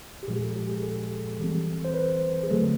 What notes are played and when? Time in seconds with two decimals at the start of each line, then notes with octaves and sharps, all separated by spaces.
0.23 G4
0.28 A#2 F3 G#3 G#4
0.42 A4
0.56 G4
0.70 G#4
0.83 A4
1.39 E3 G3 C4
1.85 C5
1.94 B4
2.43 G#4
2.50 D3 F#3 A3 A4